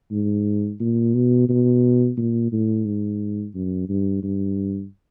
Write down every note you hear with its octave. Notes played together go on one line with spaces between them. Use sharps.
G#2
A#2
B2
B2
A#2
A2
G#2
F#2
G2
G2